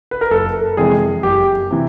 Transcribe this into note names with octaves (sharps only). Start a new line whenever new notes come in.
B4
A#4
F#1 A4
F2 C3 E3 G#3 G#4
F#1 G4
C3 E3